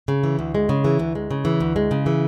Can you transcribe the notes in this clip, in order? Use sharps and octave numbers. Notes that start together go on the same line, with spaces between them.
C#3
E3
D2
G#3
C#3
E3
D2
G#3
C#3
E3
D2
G#3
C#3
E3